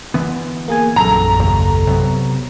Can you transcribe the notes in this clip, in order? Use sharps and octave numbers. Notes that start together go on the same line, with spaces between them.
D3 E3 B3
A#3 G#4 G#5
A#1 F#2 A4 A#5
D#2 C#3
C3 F#3 B3